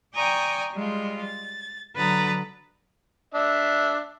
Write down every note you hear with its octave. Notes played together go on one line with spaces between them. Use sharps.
D5 G5 G#5 A#5 C#6 D#6
G3 G#3 F4
A6
D3 F#3 B4 A#5 D#6 A6
D4 E5